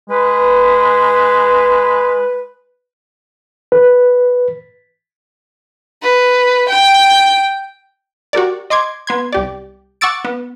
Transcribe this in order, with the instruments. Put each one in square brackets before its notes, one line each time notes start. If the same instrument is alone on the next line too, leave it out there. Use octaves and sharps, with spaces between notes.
[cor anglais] G#3 [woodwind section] B4
[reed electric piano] B4
[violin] B4
G5
[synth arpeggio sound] F#4 G4 A#4 D5
D#5 C6 D6 G#6
B3 C6 G#6
C2 G4 D5
F#5 C#6 D6 E6 A6 D7
B3